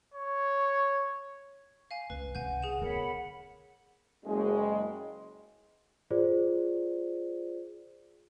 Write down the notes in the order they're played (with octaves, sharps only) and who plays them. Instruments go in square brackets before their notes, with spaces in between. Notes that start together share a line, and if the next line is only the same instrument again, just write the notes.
[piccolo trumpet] C#5
[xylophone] F5 G#5
[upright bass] C#2 [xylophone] B4
[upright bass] C2 C#3 [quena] F#5 [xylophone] G#5 G6
[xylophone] G#4 E7
[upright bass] D3 B3 [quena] A#4 [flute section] C#5 F#5 B5
[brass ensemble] F#1 C#3 G#3
[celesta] F4 G#4 C5 D5